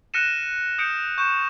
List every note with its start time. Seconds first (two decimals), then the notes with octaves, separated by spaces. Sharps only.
0.14 F6 F#6 A#6 C#7 D#7 E7
0.78 D#6 G6 C#7 D7
1.18 C#6 G6 E7